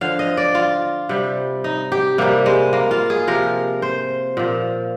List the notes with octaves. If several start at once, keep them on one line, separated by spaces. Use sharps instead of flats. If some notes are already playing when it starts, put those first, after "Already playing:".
D3 F3 F5
D#5
D5
F4
C3 G3
D#4
G4
C3 G3 A#3
G#3
A#3
F4
G#4
C3 F3 A#4
C5
A#2 F3